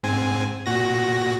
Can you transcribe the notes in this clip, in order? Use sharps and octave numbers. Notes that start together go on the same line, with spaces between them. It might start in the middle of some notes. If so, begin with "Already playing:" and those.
G#2 C4 G#5
A#2 F#4 A#6